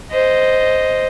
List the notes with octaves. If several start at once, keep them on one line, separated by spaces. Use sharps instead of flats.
C5 D#5